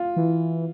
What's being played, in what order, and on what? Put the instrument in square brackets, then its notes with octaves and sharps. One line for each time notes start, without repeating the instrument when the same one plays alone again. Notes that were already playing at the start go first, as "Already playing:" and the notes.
Already playing: [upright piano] F4
[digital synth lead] E3